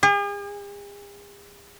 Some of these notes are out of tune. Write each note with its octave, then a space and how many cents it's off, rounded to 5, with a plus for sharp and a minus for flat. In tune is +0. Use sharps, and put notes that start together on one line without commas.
G#4 -45